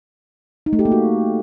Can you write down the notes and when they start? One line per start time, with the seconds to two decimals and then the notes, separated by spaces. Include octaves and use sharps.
0.66 D#4
0.73 A3
0.79 G4
0.85 A#3
0.92 F#4